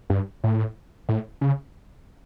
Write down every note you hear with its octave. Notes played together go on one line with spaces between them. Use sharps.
G2
A2
A2
C#3